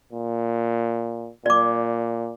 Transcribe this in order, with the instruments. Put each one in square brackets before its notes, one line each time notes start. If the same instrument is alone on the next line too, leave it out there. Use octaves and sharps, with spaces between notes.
[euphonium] A#2
[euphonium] A#2 [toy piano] D5 D6